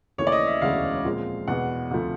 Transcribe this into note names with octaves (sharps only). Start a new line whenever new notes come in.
D#2 C#3 E3 A3 C#4 C#5
D5
D#5
E5
E1 D2 C#3 E3 G#3 F5
A#2 F3 G#3 C4 F4
E2 B2 G#3 B3 F#5
D2 C3 F3 A3